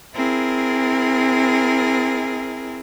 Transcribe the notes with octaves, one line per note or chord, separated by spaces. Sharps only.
C4 E4 G#4 A#4